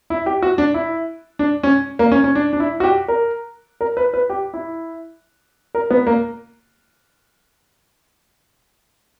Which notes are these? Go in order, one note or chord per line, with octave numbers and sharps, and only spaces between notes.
E4
G4
F#4
D4
E4
D4
C#4
A#3
C#4
C#4
D4
D4
E4
F#4
G4
A#4
A#4
B4
B4
G4
E4
A#4
B3
A#3